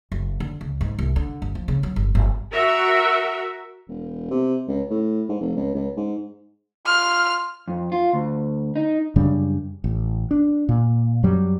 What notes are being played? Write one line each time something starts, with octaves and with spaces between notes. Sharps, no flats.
F#1
D3
C#2
G#2
C2
D3
G1
F3
C#3
F#3
G1
G1
F#4 A#4 E5
E1
C3
C#2
A2
G#2
F1
C#2
C#2
G#2
F4 F6
F2
F4
D2
D#4
F#2 C#3 G3 D4
A1
D4
A#2
F#2 F#3 G3